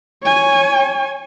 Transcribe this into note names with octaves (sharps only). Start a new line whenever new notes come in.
C#5 G#5